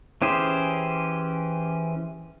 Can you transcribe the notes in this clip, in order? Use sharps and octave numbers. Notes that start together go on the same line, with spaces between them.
E3 C#4 G4 G#4 C5